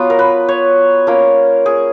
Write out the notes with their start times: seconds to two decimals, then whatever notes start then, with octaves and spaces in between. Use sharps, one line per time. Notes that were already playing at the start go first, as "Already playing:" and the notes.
Already playing: F#3 B3 F4
0.10 A#4
0.19 B4
0.49 C#5
1.07 A#3 C#4 F4 A#4
1.66 G#4